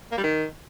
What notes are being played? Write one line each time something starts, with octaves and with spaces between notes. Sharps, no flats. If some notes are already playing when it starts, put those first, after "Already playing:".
A#3
G3
D#3